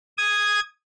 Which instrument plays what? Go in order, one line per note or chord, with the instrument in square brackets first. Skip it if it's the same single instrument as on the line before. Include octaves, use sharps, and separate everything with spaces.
[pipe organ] D#6 G#6